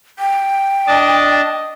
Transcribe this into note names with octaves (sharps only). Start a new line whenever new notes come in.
G5
D4 D#5 A5